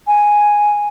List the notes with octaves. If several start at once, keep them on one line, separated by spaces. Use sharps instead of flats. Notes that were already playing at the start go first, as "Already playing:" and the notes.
G#5